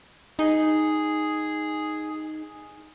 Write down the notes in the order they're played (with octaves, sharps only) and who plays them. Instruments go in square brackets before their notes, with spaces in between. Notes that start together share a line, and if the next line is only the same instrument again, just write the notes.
[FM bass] D#4 [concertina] G#4